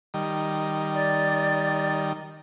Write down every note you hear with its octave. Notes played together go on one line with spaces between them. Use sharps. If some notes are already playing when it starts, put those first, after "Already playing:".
D#3 G3
D5